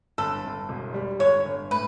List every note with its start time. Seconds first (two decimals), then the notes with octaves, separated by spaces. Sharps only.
0.18 G1 A4
0.44 G1
0.69 E1
0.94 G3
1.19 G1 C#5
1.45 G1
1.71 A2 B4